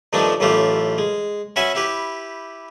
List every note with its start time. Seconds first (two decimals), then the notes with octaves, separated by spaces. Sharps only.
0.13 G2 D#3 F3 A3 D4 D#4
0.40 A1 F#2 E3 A3 F4 G4
0.98 G#3
1.56 C#4 F#4 B4 E5 F#5 G#5
1.75 E4 G4 B4